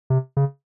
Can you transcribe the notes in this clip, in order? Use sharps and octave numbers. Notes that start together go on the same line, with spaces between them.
C3
C#3